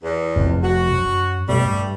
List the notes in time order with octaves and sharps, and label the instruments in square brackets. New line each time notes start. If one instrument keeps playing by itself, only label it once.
[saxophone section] E2
[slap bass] F1 F2
[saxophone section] F#4
[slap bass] F#2
[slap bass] B2 [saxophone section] G3 A3
[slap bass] G2